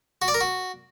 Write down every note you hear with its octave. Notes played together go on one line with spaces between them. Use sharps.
F#4
D5
A#4
F#4